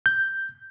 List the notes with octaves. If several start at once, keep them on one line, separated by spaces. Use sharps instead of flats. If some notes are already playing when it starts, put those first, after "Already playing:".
G6